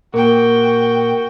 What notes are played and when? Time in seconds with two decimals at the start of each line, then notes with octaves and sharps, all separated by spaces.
0.14 A#2 A#3 F#4 G5